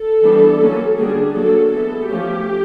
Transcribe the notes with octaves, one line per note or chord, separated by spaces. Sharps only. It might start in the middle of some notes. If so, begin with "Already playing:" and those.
Already playing: A4
E3 G3 B3 D4
F#3 A#3 C#4
D3 G3 A#3 D4 G#4
F#3 A#3 D4 A4
E3 G#3 B3 A4
F3 A3 C#4 G4